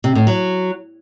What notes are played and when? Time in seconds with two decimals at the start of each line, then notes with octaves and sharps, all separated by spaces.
0.04 C3
0.15 A2
0.27 F#3